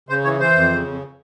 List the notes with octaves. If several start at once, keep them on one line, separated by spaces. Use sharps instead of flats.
C#3 C5
E3 C#5
E3 C5
F2
C#3
F2